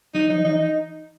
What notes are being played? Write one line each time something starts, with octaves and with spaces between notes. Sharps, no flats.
F#3 D#4
F3 D#4
E3 D#4
D#4